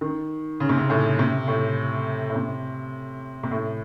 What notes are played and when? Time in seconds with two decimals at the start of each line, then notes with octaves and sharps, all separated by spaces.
0.01 D#3
0.60 C#3
0.69 C3
0.78 C#3
0.90 A2
1.19 C3
1.48 A2
2.30 A2
2.35 C3
3.43 C3
3.51 A2